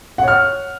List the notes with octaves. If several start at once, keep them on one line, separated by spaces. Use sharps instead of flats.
C#5 F#5 F6